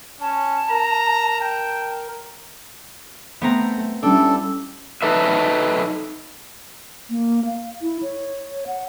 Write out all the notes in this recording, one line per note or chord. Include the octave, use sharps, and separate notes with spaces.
C#4 A5
A#4 A#5
G5 A5
A3 B3 C4 A#5
G3 C#4 D4 E4 A4
D#4 A4 B4 E5
A#3
F5
E4
C#5
F#5